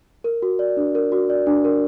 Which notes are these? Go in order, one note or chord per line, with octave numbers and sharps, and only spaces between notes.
A#4
F#4
D5
D4
A#4
F#4
D5
D4
A#4